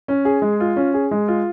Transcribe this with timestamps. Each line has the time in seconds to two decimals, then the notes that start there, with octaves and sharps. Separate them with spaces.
0.08 C#4
0.25 G#4
0.42 G#3
0.60 F4
0.76 C#4
0.94 G#4
1.11 G#3
1.28 F4